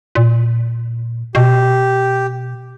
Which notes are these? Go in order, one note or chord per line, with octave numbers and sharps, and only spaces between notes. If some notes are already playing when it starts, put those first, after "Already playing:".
A#2
B2 G4